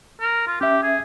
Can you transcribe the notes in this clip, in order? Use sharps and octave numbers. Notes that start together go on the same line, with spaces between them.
A#4
F4
C#4 G4 E5
G#4